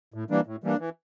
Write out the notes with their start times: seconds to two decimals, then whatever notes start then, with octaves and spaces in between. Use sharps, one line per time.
0.14 A2
0.30 E3 G3 A#3 D4
0.46 A2
0.64 E3 G3 A#3 D4
0.80 E3